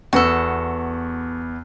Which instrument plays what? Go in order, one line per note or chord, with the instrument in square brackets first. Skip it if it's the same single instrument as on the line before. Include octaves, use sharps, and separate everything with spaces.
[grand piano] E2 B3 [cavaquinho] F#4 A4